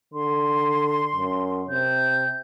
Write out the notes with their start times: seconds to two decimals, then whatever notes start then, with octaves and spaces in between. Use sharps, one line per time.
0.14 D3 C6
1.16 F#2
1.70 C3 G6